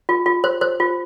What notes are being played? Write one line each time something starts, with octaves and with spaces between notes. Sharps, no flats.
F4
F4
C5
C5
F4